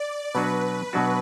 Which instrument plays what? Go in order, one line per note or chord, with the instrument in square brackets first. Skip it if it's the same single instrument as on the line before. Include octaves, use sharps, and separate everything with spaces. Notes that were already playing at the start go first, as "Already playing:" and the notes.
Already playing: [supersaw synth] D5
[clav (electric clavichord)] B2 F#3 D4 F#4 [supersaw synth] B4
[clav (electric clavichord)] B2 F#3 D4 F#4